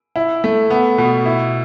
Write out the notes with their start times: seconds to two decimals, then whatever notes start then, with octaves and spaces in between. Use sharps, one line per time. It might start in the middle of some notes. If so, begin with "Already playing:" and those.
0.16 E4
0.44 A3
0.70 B3
0.98 B2
1.26 E4